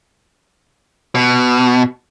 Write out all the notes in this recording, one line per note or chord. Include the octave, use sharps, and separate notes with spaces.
B2